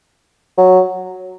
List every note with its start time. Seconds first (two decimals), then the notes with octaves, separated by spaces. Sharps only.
0.57 F#3